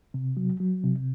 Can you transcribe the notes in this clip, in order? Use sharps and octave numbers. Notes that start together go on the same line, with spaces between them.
C3
F#3
F#3
C3